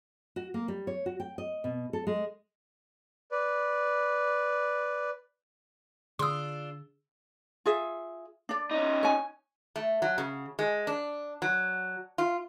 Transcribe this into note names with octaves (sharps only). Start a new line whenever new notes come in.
F#4
A#3
G3
C#5
F#4
G5
D#5
B2
A4
G#3
B4 D5
D3 D4 F4 G#4 C6 D#6 E6
F4 G#4 E5
D4 D5
C#4 D#4
C#5 G#5
A3
F#3
C#3
G#3
D4
F#3
F4